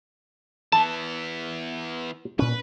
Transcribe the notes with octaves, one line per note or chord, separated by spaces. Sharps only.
E3 B3 A5
A#2 C#4 B4